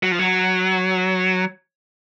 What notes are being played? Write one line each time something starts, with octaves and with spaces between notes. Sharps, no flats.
F#3
F3
F#3